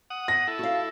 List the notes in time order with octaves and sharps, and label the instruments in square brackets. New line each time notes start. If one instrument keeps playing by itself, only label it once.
[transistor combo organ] F#5 D#6
[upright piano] A#6
[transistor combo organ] E4 A4
[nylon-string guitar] F#4 F5